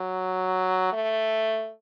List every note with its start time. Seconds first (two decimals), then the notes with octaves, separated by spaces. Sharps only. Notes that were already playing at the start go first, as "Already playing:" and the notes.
Already playing: F#3
0.93 A3